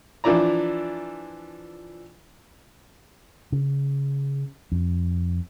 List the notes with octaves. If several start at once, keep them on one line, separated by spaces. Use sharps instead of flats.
E3 F3 D4 E4 D5 A#5
C#3
F2